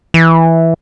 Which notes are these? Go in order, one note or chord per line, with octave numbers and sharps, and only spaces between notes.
E3